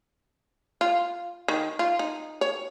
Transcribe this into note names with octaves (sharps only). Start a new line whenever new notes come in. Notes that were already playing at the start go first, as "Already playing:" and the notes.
F4
D#3
F4
D#4
C#5